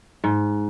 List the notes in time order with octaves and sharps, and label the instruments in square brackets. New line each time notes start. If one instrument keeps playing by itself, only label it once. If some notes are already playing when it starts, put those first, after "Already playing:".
[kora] G#2